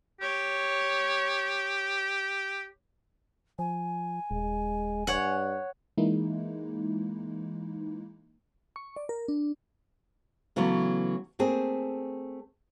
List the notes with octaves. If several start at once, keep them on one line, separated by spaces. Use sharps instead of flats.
G4 C#5
F3 G#5
D#1 G#3
G2 C#5 F#5
E3 G#3 A#3 D#4 E4
C#6
D5
A#4
D4
C#3 E3 F#3 A3 B3
A3 A#3 C4 G#4